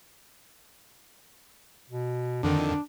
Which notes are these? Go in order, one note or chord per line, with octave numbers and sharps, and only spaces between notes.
B2
F2 D3 D#3 D4